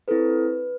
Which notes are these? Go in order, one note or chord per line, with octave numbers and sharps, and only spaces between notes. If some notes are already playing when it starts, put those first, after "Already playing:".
C4 E4 A4 B4